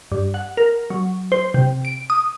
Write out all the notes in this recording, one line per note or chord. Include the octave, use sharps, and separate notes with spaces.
G2
F#5
A#4
F#3
C5
C3
D7
D#6